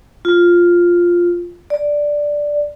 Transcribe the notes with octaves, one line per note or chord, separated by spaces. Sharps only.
F4
D5